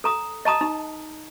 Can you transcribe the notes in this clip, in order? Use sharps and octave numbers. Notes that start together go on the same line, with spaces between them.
A4 A#5 D#6
D#5 A5 A#5 D#6
D#4